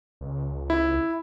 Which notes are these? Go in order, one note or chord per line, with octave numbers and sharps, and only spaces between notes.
C#2
E4